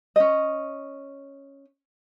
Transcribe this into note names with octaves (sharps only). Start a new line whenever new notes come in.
C#4 D#5